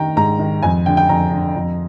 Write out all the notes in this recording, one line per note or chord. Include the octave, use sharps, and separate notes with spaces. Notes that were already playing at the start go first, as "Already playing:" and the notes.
Already playing: D#3 G5 A#5
G#2 A#5
D#3
F2 G#5
D3 G5
G5
F2 A#5
D3
F2